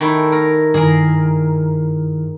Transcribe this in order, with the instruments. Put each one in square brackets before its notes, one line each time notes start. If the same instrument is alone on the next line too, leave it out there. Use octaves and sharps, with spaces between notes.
[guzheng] D#3 A3 E4
A#4
[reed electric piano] G2 D#3 E4 [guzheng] G#4 A#4